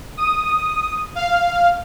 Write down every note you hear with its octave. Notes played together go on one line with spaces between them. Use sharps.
D#6
F5